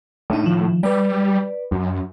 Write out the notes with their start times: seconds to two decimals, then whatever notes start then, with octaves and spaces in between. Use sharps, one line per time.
0.30 A2 D3 D#4
0.44 D#3 F3
0.83 G3 B4 D5
1.71 F#2